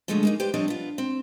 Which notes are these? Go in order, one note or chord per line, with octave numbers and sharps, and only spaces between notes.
D3 F3 F#3 G#3 A3 C#4
G#3 A#3 D#4
G4 B4 C5 D5
F3 G3 C4 D4 C#5 D#5
B3 F4
C4